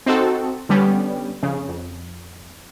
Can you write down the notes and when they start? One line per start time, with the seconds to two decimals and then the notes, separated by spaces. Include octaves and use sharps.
0.06 C4 D#4 F#4 A4
0.69 D3 G3 B3 C#4
1.42 F2 C#3
1.69 F2